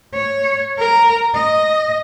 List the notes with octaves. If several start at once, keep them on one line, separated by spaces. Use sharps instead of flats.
C#5
A#4
D#5